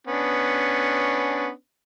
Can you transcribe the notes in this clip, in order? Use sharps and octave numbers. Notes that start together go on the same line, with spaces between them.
B3 C#4 D4